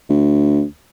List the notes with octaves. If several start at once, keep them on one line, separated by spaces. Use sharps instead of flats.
D2